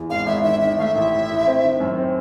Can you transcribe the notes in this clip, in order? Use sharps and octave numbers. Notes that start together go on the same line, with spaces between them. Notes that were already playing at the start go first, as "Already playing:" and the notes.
Already playing: E2
G#1 F5
G#1 E5
D#3 E5
D#3 E5
A3 E5 F5
A1
A2
A2
C4
D#3
F#2
C4